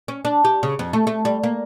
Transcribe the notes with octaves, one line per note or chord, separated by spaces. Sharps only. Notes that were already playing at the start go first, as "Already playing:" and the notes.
C#4
D4
G4
C#3
F2
A3
A3
G3
A#3